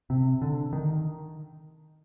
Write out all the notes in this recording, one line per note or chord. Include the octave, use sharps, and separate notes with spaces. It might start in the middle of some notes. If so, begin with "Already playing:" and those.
C3
D3
D#3